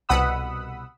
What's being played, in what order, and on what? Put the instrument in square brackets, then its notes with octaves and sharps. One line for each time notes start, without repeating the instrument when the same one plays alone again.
[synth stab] C2 B2 F#5 B5 D#6 E6